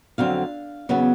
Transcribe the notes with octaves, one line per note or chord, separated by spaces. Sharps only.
F2 D3 F#3 C4 F5
E2 C#3 F#3 B3